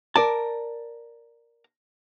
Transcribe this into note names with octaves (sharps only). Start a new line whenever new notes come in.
A#4 D5 A5